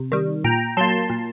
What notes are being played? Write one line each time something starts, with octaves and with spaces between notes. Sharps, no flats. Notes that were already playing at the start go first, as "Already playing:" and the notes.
Already playing: C3
D#3 G3
A#2 G5 A#5
F#3 A#3 A5 C6
A#2